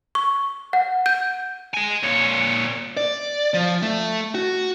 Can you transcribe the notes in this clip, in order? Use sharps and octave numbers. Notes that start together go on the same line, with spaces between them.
C#6
F#5
G6
D#5 G#5
A#2 C#5
D5
F3
A3
F#4